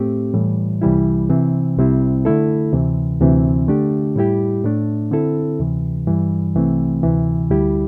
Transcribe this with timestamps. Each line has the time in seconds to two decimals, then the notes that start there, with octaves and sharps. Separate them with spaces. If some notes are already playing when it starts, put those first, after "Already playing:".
Already playing: A2 A3 C4 G4
0.34 A2 E3 G3
0.82 C2 C3 E3 G3 E4
1.29 C3 E3 C4
1.77 C2 C3 G3 C4 E4
2.25 D3 A3 E4 A4
2.73 D2 C3 E3
3.20 D2 C3 E3 C4
3.68 D3 A3 D4 G4
4.16 A2 G3 E4 G4
4.64 A2 A3 D4
5.11 D3 C4 E4 A4
5.60 D2 C3 E3
6.07 G2 E3 G3
6.55 C2 C3 E3 A3 C4
7.03 D2 C3 E3
7.51 D2 D3 G3 E4 G4